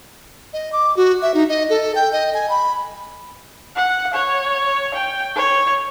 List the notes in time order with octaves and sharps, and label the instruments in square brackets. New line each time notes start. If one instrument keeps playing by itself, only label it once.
[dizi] D#5
D6
F#4
E5
D#4
D#5
A4
G5
D#5
G#5
B5
[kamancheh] F#5
C#5
G5
C#5